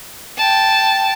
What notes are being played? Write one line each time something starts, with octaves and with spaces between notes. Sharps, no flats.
G5 A5